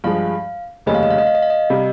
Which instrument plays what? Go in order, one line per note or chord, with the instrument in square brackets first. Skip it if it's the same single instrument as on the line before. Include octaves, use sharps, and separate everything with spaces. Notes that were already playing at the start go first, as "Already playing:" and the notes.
[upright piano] G2 F3 G#3 [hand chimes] F5
[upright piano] F1 D#2 C#3 G3 C#4 [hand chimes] D#5
[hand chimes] F5
D#5
F5
D#5
F5
D#5
F5
D#5
[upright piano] C3 G3